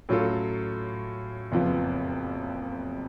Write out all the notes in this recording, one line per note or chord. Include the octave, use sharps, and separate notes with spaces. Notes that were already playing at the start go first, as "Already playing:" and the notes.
A2 F#3 C#4 F4 A4
F#1 F2 F3 B3